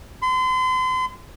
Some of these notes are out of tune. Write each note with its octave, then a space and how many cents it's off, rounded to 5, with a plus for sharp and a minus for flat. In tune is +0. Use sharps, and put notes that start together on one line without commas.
C6 -40